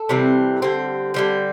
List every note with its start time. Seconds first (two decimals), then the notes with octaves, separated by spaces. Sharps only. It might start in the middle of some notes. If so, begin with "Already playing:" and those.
Already playing: A4
0.09 C3 E3 G3 C4
0.62 D3 G3 C4
1.14 D3 G3 C4